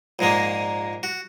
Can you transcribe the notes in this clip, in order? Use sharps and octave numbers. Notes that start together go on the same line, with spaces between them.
A#1 G#2 G#3 A#3
F#4